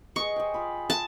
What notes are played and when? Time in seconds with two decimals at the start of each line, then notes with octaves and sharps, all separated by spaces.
0.16 G#4 B4 D#5 C#6
0.36 G#4 C5 G5
0.54 F4 F5 B5
0.90 A5